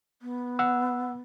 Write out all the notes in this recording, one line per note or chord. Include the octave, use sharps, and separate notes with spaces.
B3
F#5 E6